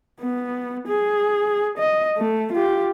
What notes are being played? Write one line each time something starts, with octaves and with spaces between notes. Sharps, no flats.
B3
G#4
D#5
A3
F4 G4